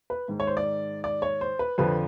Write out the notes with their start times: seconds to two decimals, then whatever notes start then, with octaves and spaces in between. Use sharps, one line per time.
0.10 B4
0.28 G#2 D#3
0.40 C#5
0.47 C5
0.57 D5
1.04 D5
1.22 C#5
1.41 C5
1.59 B4
1.78 F2 D3 F3 B4